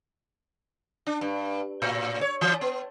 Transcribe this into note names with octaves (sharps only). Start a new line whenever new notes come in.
D4
G2
A2
C#5
E3
B3